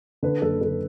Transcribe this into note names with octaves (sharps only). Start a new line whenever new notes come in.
D3 B4
F#1 A4
D3 A4